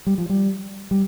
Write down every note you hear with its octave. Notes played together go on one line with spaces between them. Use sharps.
G3
F3
G3
G3